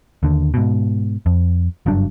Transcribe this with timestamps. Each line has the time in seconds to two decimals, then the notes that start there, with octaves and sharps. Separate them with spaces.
0.23 D#2 D3
0.54 G#2 B2
1.26 F2
1.86 F#1 G2 F#3 D4